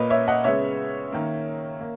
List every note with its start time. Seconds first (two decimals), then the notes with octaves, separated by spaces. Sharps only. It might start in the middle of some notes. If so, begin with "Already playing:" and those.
Already playing: A#2 A#3 B4 C#5 D#5
0.10 C#5 E5
0.28 D#5 F#5
0.44 C#3 G#3 B3 C#5 E5
1.13 D#3 A#3
1.80 A#3